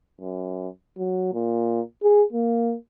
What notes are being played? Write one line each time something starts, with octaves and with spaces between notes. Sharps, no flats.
F#2
F#3
A#2
G#4
A#3